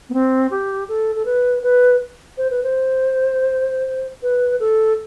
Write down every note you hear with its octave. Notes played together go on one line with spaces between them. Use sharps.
B3
C4
G4
A4
A4
B4
B4
C5
B4
C5
B4
A4